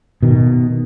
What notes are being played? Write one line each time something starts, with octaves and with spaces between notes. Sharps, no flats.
B2 D#3